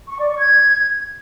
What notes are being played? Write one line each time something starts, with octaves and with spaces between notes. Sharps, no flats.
C#6
D5
C#6
G#6